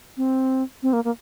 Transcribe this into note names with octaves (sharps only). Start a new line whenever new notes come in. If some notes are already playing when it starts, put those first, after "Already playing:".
C4
C4
A#3
A#3